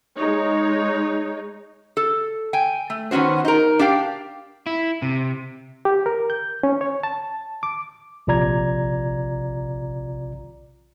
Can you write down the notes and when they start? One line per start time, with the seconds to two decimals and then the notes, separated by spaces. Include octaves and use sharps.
0.16 G#3 D#4 C#5
1.97 A4
2.53 G5 G#5
2.90 A3
3.11 D#3 B3 C#4 F#4 C5
3.45 D#4 A#4
3.79 D4 G4 F5 G5
4.66 E4
5.02 C3
5.85 G4
6.06 A#4
6.30 G6
6.63 C#4
6.81 C#5
7.03 A5
7.63 D6
8.27 A#1 C3 F4 D5 A#5 G#6